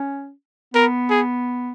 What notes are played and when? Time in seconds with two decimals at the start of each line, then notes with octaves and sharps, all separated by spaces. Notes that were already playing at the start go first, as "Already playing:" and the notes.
Already playing: C#4
0.74 B3 A#4
1.10 G#4